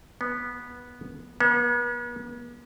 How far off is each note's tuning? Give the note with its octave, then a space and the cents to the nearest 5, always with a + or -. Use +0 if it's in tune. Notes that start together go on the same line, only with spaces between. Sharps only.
B3 -10
B3 -40